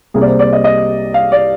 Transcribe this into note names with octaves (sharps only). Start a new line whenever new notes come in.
C2 C3 G3 A#3 G#4
D5
C5
D5
D#5
D#5
F5
D5